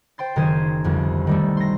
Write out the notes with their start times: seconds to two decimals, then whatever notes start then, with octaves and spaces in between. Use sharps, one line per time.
0.18 C5 G5 C6 A6
0.36 F#1 D#3 G#4 C5 G#6 D#7
0.84 G1 C2 F2
1.27 D#3 G3 A3
1.57 C6 A#6